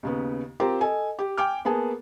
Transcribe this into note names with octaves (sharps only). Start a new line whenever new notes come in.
D#2 C#3 B3
C4 F4 G4 A#4 C5 A#5
A4 D#5 G#5
G4
G5 G#5 D6 F6
A#3 B3 G#4 A5